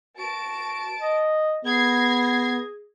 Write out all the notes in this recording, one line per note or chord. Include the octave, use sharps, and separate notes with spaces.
F#4 A5 D7
D#5
B3 G#4 G#6 A#6 C7